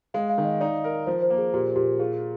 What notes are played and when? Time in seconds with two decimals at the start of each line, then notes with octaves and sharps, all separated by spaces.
0.14 G#3 F5
0.30 F5
0.38 D#3
0.45 D#5
0.61 D#4 D5
0.84 A#4
1.06 F3 C5
1.22 C5
1.30 A#3
1.38 G#4
1.54 A#2 G4
1.76 A#2 G4
1.99 F4 G#4